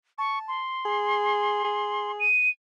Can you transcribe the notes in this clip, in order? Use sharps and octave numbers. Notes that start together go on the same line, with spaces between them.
A5 C#6
C6
G#4
G#4
D#7